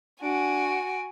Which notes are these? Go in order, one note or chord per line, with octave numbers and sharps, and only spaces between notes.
D4 F#4 G#5 D7